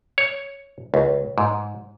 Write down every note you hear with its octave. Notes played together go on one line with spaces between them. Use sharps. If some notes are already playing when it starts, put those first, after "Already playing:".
C#5
C#2
G#2